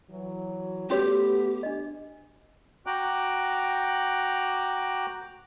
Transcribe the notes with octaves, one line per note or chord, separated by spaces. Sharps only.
E3 F#3
A3 B3 C#4 F#4 G4 C#5
D4 D#5
F#4 G5 A#5 D6 F#6